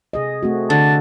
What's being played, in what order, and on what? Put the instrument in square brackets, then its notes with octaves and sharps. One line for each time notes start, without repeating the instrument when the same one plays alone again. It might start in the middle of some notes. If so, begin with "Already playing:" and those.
[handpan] C3 G#4 D#5
A3 C4 F#4
[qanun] D3 [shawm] A5